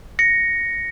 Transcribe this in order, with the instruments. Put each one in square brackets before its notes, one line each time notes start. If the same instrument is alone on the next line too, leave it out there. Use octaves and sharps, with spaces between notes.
[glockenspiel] A#6 C#7